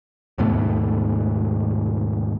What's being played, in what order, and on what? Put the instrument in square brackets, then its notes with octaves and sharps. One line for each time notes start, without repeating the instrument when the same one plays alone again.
[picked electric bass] D#2 G#2 B2 A3